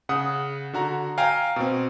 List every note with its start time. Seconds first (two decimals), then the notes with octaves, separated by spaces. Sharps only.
0.09 C#3 F#5 D#6
0.73 D3 F#4 A#5
1.18 F5 G5 G#5 A#5
1.56 B2 C4